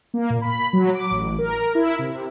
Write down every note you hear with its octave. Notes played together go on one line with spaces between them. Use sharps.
A#3
A#2
B5
F#3
D6
A1
A#4
E4
C3